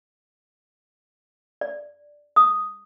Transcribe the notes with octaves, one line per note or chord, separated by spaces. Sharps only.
D5
D#6